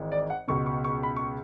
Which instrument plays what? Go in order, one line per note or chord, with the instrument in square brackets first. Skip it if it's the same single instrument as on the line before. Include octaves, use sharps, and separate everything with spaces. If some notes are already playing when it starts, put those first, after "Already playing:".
Already playing: [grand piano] G#1 G#2 E3
D5
F#5
C#2 B2 C#6
C#6
C#6
B5
C#6